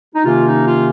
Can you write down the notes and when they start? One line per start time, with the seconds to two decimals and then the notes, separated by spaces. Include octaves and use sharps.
0.14 D#4
0.24 C3 D#3 A#3 C#4 F4
0.45 D#4
0.65 F4